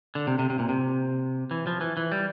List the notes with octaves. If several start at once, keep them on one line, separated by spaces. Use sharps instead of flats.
D3
C3
C3
C3
A#2
C3
E3
F3
E3
E3
G3